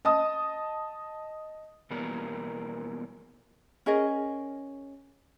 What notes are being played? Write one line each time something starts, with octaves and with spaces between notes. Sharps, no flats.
D#5 A5 D#6
B2 E3 G3 A#3 B3 A#4
C#4 G#4 A#4 D#5